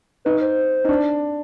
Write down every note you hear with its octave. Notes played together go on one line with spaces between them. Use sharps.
D#4 B4
C5
D#4
D4